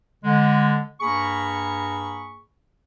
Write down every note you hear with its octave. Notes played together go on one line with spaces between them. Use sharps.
D3 G#3
G2 A#3 G#4 B5 C#6